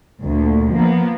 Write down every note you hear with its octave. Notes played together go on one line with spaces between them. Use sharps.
D2 A#2
F3 A#3 B3